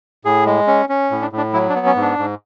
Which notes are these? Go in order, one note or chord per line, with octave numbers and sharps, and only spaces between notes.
A2 G#4
G#3
C#4
C#4
A2
D4
A2 D4
F#3 E4
D4
B3
C#4
G#2
D4
G#2